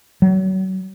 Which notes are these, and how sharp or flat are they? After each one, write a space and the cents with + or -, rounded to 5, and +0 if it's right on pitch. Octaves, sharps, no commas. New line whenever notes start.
F#3 +35